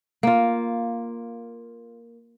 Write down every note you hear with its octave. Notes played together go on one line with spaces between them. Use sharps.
A#3 F4